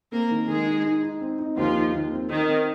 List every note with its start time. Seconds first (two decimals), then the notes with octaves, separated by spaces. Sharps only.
0.12 A#3 C4 A#4
0.30 D#3
0.48 D#3 G#3 G#4
0.66 D#4
0.85 D#4
1.03 D#4
1.21 C4
1.39 D#4
1.57 D#2 F3 F4
1.75 D#4
1.93 D#2
2.12 C4
2.29 D#3 C4
2.47 C4